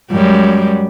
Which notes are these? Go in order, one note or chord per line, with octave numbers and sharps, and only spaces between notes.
F#2 G3 G#3